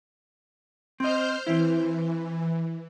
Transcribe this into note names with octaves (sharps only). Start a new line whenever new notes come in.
C4 C5 D#5 F6 G6
E3 C4 E4